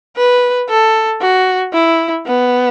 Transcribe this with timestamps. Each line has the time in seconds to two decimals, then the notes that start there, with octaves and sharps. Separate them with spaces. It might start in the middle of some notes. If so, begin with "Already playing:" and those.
0.17 B4
0.69 A4
1.21 F#4
1.74 E4
2.26 B3